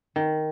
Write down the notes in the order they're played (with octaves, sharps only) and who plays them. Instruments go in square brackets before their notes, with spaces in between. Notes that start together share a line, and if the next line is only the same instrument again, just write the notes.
[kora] D#3